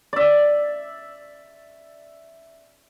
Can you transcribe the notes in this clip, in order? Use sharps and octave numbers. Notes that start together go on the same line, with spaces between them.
D5 E5